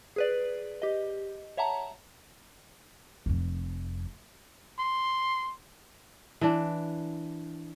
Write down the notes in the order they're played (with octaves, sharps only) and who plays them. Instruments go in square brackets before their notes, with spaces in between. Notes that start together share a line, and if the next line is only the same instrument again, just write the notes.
[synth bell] G#4 B4 D5
G4 D#5
C#5 E5 F#5 A5 A#5
[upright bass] F1 F2
[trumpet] C6
[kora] E3 D4